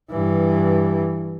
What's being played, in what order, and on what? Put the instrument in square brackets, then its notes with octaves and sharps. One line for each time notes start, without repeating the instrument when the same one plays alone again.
[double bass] G2 E3